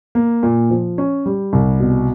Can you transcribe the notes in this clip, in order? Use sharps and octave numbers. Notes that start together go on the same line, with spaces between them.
A#3
A#2
F3
C#4
G3
C2
B2